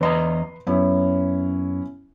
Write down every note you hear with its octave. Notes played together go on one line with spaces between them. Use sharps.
E2 B4 D#5 A#5 C6
F#2 B3 C#4 E4